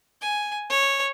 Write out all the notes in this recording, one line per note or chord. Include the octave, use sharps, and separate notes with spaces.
G#5
C#5